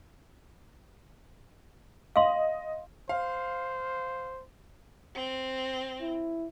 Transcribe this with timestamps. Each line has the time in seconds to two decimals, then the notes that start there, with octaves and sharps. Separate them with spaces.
2.16 D#5 F5 C6
3.09 C5 F5
5.14 C4
6.01 E4